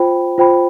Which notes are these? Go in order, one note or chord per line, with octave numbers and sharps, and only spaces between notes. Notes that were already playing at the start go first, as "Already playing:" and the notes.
Already playing: F4 C5 G5 B5
F4 C5 G5 B5